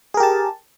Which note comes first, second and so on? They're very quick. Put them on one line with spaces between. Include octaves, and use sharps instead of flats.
G#4 A#4 G4 A5